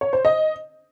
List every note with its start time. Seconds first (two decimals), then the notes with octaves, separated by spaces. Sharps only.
0.01 C#5
0.13 C5
0.25 D#5